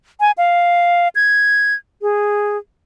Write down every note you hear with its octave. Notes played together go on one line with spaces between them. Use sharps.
G#5
F5
G#6
G#4